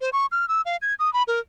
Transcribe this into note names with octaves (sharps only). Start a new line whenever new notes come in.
C5
C#6
F6
E6
F5
G#6
D#6
B5
A#4